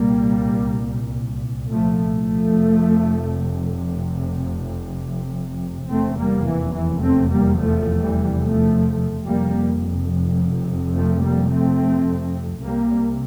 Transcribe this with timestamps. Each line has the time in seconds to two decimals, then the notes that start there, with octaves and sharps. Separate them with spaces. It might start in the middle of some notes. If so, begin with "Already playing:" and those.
Already playing: C2 A#2 G3 A#3
1.69 F3 A3
2.12 F3 A3
2.53 F1 F2 C3
5.90 F1 E2 C3 A3 C4
6.18 G3 A#3
6.45 E3
6.74 E3
7.02 A3 C4
7.30 G3 A#3
7.58 F3 A3
8.00 E3 G3
8.42 F3 A3
9.26 F1 F2 C3 G3 A#3
10.95 F3 A3
11.22 G3 A#3
11.50 A3 C4
12.62 C2 C3 G3 A#3